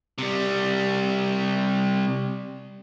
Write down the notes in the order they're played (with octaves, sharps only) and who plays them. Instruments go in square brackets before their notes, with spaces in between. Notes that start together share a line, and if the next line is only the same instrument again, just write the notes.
[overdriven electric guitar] C3 G3